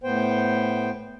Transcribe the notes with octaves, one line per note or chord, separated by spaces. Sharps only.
A2 B3 C5 G5